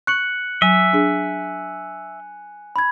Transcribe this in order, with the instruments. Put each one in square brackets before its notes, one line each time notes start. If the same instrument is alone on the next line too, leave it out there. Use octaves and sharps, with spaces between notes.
[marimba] C#6 [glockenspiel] F#6 C#7 F#7
[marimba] F#3 [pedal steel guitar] E5 [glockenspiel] G#5 D#7
[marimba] D4 G#4
[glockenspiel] B5 G#6